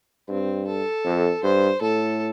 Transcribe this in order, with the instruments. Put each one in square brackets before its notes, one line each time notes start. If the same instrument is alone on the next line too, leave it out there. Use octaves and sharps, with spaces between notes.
[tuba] G2 [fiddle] C4
[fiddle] A4
[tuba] F2
[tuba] G2 [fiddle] C5
[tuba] A2 [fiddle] A4